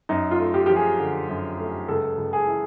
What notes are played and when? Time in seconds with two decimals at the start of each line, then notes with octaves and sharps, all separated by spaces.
0.09 F#2 D#4
0.31 F4
0.39 A3
0.54 G4
0.66 F3 G4
0.76 G#4
0.99 D3
1.29 F#2
1.59 A3
1.88 C#2 A4
2.18 C#2
2.33 G#4
2.47 E3